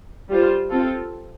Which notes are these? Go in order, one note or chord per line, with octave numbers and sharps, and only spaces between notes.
G3 F4 C5
C4 F4 A4